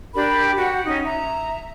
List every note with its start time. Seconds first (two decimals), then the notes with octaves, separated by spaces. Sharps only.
0.14 D4 G4 A#4 B5
0.57 F#4 F#5 G5
0.85 C#4 D#4
1.05 E5 A#5